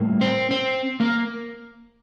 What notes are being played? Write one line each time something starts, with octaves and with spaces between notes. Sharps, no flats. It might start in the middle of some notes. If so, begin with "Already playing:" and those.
Already playing: A2 G3 A#3
C4 C5
C4 C5
A#3 A#4